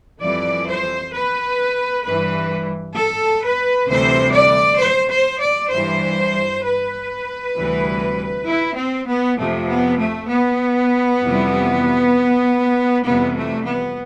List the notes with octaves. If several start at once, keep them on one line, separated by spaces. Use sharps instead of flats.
F2 E3 G3 D5
C5
B4
G2 E3 G3 B4
A4
B4
D2 C3 E3 G3 C5
D5
C5
C5
D5
G2 E3 G3 C5
B4
D2 C3 E3 G3
E4
C4
B3
F2 C3 F3 A3
B3
A3
B3
F2 C3 E3 G3
F2 C3 E3 G3 B3
A3
B3